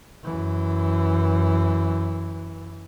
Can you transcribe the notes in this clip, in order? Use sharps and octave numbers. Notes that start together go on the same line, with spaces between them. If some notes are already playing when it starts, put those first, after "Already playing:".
F#2 E3